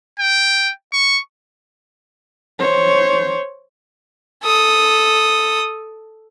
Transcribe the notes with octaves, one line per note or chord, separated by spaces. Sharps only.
G5
C#6
C5 C#5
A4 D#6